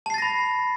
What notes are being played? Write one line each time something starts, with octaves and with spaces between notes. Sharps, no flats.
A5 B5 A6 A#6 C7